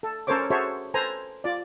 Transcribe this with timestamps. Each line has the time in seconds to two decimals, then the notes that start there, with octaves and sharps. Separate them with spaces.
0.03 A4
0.27 C#4 A4 A#4 C5 C#5 D6
0.50 F#4 G#4 A4 C5 C#5 E5
0.94 A4 B4 C5 G#5 A#5
1.44 F4 D5